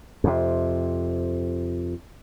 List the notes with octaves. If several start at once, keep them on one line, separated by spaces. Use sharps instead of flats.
F2 C3